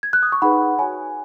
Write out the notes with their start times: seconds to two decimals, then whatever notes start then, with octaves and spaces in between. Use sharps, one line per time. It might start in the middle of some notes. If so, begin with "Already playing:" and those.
0.03 G#6
0.13 F#6
0.23 D#6
0.32 C#6
0.42 D#4 G#4 B4 F#5 B5
0.79 F#4 C#5 G#5